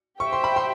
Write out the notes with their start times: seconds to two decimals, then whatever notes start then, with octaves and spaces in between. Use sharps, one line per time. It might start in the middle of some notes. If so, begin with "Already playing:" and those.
0.20 G4 C5 E5 G5 C#6
0.33 C6
0.44 B5
0.56 C6